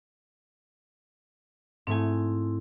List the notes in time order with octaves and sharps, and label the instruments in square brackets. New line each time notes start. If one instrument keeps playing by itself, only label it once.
[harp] G#2 A3 G#5 [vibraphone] C4 E4